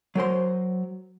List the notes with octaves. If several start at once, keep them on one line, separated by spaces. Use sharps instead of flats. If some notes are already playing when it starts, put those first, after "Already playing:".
F#3 A#4 C5 C6